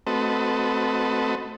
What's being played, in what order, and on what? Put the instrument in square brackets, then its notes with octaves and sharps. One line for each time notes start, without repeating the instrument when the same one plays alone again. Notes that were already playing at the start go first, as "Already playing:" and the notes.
[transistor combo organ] A3 C4 F#4 A4 B4 D#5